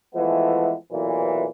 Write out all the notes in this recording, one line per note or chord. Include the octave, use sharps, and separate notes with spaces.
E3 F3 G#3 A3 B3
B1 A#2 E3